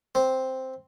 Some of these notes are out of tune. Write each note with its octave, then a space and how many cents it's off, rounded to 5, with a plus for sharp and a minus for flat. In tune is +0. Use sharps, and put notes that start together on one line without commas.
C4 +0 C5 +0